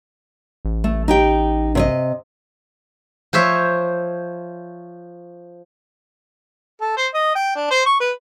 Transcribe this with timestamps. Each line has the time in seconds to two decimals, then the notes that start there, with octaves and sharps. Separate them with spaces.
0.65 A1
0.84 A3
1.08 D#4 G4 G5
1.75 C3 C#5 D#5
3.33 F3 C5 C#5 E5
6.81 A4
6.97 C5
7.14 D#5
7.35 G5
7.55 D4
7.71 C5
7.86 C#6
8.00 B4